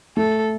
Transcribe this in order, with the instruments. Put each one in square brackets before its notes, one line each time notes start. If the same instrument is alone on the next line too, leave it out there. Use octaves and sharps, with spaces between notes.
[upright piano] A3 [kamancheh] A4